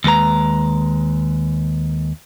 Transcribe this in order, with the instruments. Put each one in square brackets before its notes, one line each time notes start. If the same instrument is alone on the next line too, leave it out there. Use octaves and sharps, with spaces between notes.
[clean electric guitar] D#2 G#3 B4 A#5